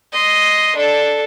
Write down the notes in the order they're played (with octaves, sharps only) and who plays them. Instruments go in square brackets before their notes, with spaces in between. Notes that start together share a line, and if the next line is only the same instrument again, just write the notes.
[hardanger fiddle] D#5 C6
D4 A4